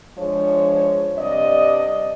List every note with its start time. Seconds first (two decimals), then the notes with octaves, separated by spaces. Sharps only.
0.18 F3 G#3 D4 C#5
1.17 G2 C3 D5 D#5